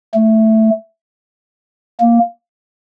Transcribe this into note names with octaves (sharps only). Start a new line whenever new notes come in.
A3
A#3